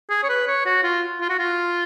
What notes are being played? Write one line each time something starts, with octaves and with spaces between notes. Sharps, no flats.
G#4
C#5
B4
C#5
F#4
F4
F4
F#4
F4